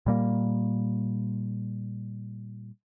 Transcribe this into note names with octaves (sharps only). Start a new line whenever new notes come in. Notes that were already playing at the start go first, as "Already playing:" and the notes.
A#2 G3 A#3